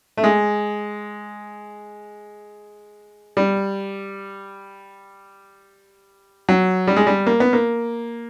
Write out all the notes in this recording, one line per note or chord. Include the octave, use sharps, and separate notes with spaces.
A3
G#3
G3
F#3
G3
G#3
G3
A#3
B3
A#3